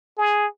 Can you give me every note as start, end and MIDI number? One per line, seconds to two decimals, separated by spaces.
0.18 0.47 68